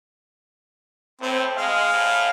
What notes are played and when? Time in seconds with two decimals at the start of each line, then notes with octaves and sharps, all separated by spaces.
1.21 A2 C4
1.57 G#3 F5
1.94 A2